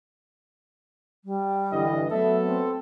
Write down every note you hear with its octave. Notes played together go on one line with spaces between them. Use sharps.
G3
G2 D3 E3 D#5
F#3 A3 B3 A4 E5
C4